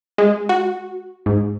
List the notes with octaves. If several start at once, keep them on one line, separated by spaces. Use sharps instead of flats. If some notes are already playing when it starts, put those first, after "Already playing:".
G#3
F#4
G#2